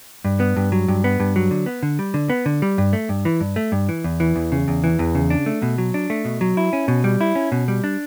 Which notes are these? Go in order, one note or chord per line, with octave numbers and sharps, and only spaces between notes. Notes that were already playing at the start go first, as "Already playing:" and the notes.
G2
B3
G2
F#3
G2
B3
G2
F#3
D3
B3
D3
G3
D3
B3
D3
G3
G2
A3
G2
E3
G2
A3
G2
E3
E2
E3
E2
C#3
E2
E3
E2
C#3
D4
A3
B2
F#3
D4
A3
B2
F#3
E4
C#4
B2
G3
E4
C#4
B2
G3
D4